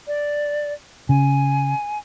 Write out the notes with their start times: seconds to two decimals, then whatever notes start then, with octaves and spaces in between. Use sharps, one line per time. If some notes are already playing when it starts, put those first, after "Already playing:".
0.07 D5
1.09 C#3 G#5